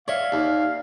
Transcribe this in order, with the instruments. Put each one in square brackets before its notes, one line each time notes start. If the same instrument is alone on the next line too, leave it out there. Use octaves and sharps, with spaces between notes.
[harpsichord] C#5 [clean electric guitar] D5 E5 [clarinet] F5
[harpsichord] D#2